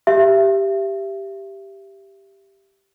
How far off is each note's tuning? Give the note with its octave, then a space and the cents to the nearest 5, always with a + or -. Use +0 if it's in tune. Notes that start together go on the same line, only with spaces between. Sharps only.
G4 +0 E5 +30